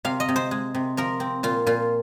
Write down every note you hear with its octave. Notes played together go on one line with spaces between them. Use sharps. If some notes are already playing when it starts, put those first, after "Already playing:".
C3 F5
D#5
C3
C5
G#3
C3
F3 A#4
C4
A#2 F4
A#2 F4